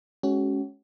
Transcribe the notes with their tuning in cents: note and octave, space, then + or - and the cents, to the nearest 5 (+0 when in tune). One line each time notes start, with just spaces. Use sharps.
G#3 +25 C#4 +0 F#4 +30